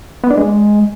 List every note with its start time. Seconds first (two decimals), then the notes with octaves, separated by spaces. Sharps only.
0.24 B3
0.30 D4
0.37 G#3